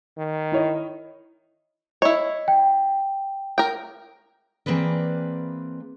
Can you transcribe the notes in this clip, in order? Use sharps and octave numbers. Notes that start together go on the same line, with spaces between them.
D#3
E4 C#5 D#5
E4 C#5 D#5
G5
A#4 G5
E3 A#3 C4 G#4 B4 D5